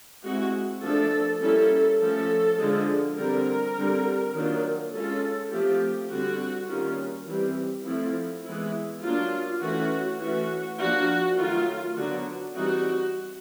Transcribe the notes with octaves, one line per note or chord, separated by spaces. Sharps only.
G#3 C4 E4 F#4
F3 A3 D4 A4
G3 A#3 C#4 E4 A4
F3 A3 C#4 A4
D3 F3 G#3
D3 G3 C4 A#4
D3 G3 C4
D#3 F#3 A#3 D4 F4
G#3 C#4 F4 A4
F3 A3 C4 F4 G4
D3 G3 C4 F#4
D#3 G3 A#3 C#4 F4
E3 G3 C4
F3 A3 C4 E4
E3 G#3 B3 E4
F#3 A#3 D4 F4
E3 A3 C#4 F#4
E3 A3 C#4 F#4
F3 A#3 D4 F#4
D#3 F#3 A3 F4
D3 F#3 B3 D4 F#4
E3 G3 C4 D#4 F#4